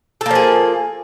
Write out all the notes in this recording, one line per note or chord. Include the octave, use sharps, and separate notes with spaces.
F3 A#3 G#4 A4